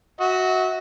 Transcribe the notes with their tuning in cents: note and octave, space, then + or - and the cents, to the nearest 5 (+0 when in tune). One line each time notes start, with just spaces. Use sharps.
F#4 +0 E5 -35